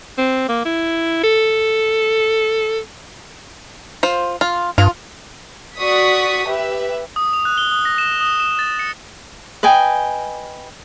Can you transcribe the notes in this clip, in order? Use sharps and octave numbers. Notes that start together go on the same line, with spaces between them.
C4
A#3
E4
A4
F4 C5
F4
G2 F4
F#4 D5 C#6 D#6 B6
G4 B4 E5
D#6
F7
F#6
G7
D#6
A#6
E7
D#6
E7
A6
C#7
B4 D#5 G5 G#5